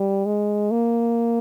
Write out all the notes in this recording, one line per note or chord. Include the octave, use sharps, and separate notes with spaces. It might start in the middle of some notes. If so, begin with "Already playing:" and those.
Already playing: G3
G#3
A#3